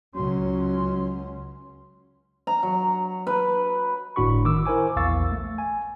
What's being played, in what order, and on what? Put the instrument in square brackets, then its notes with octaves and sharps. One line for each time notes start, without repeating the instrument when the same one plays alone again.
[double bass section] C#2 C#4 [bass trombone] F#3 [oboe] C6
[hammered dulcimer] A#5
F#3
B4
[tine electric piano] G1 A2 D4 F#4 B5 C#6
D#3 D6 E6
E4 A#4 C5 G#5 D6
A#1 E2 F5 C#6 E6 A6
A3
G#5